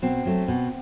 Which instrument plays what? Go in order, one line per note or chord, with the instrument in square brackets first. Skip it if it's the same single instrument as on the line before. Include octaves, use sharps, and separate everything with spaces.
[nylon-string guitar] B2 C4
F#3 A3
B2